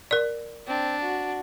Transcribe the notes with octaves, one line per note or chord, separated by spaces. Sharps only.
A#4 D5
C4 D4
F#4